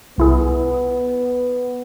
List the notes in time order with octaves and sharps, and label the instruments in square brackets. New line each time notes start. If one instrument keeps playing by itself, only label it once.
[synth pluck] C2 E4 G#4 [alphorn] B3